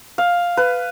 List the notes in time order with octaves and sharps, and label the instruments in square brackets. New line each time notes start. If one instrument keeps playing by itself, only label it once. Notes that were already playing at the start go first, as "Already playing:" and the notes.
[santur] F5
B4